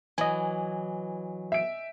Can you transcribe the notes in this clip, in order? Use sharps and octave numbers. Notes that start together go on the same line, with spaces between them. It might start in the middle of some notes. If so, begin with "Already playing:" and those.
E3 F#3 D#5 G#5
E5 D7